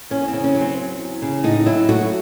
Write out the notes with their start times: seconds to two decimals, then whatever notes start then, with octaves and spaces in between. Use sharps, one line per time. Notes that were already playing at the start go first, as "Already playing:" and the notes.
0.10 E2 C#4
0.28 C#3 C4
0.44 C#4
0.55 F#3
0.61 C4
0.77 C4
0.99 E2
1.22 C#3
1.44 A2 D#4
1.66 F#3 E4
1.89 A3 F#4